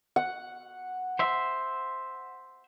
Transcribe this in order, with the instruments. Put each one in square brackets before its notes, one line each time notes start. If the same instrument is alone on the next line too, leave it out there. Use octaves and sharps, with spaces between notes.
[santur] F#5
[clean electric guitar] C5 E5